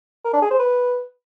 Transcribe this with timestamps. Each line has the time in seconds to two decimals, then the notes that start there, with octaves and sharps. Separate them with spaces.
0.25 A#4
0.33 D4
0.42 G#4
0.51 C5
0.59 B4